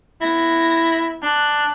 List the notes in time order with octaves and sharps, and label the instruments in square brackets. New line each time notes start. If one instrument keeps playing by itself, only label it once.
[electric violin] B3 A#6 [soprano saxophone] E4
[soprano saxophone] D4 [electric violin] F#6